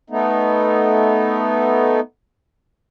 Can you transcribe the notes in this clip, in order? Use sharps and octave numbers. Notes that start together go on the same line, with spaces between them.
A3 B3 D#4